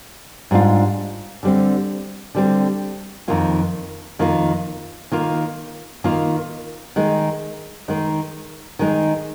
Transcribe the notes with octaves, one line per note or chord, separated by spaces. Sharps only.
G#2 G3 D4 F4
D3 G3 C4
D3 G3 C4
F2 D#3 A#3 F4
F2 D#3 A#3 F4
D#3 A#3 F4
D#3 A#3 F4
D#3 G#3 D#4
D#3 G#3 D#4
D#3 G#3 D#4